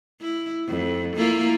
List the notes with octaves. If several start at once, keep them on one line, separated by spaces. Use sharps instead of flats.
E4
F2
A#3 E4 F4